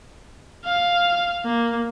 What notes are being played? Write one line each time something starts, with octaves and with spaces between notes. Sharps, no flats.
F5
A#3